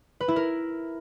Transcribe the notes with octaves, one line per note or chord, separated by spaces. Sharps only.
B4
E4
A#4